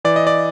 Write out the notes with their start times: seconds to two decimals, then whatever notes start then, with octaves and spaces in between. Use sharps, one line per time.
0.05 E3 D5
0.16 D#5
0.27 D5